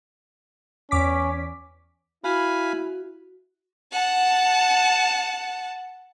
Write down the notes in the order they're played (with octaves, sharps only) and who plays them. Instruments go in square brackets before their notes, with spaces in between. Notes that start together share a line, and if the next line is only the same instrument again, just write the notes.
[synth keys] E2 D6 B6 [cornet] C#4
[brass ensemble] E4 [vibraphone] F#4 [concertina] F5 G#5 B5
[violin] F#5 A5